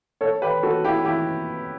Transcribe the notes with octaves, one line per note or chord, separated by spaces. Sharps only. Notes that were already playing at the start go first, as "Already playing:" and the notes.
A4 C#5
G4 B4
F#4 A4
E4 G4
E4 G4